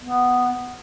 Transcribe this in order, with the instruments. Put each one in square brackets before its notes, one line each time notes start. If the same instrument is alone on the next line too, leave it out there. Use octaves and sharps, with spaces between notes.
[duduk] B3